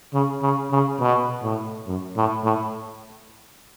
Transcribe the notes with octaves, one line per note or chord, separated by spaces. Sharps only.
C#3
C#3
C#3
B2
A2
F#2
A2
A2